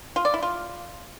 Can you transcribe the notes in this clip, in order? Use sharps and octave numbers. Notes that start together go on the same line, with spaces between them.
F4
D5
E4
F4